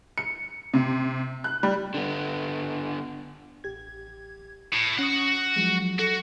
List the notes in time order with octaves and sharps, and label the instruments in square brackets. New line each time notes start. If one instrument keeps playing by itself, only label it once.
[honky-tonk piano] C#7
C3
F#6
G3
[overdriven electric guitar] D3 B3
[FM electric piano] A1 G4 G#6
[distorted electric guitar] A2
[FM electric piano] C#4 C#6 D#6 [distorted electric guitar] F#4 F#5
[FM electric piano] F3 F#3 G#3
[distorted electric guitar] F#4 [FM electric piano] A4